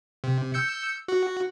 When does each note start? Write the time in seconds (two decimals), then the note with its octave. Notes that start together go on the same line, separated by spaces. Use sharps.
0.24 C3
0.54 E6 G6 C#7
1.08 F#4